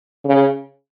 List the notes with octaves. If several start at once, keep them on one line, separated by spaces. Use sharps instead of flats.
C#3